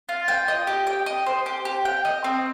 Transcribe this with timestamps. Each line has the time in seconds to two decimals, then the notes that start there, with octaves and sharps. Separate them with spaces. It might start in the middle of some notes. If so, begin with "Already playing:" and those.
0.09 F4
0.28 G5
0.48 D#5
0.67 G4
0.87 G5
1.06 D#5
1.26 C5
1.46 G4
1.65 G4
1.85 G5
2.05 D#5
2.24 C4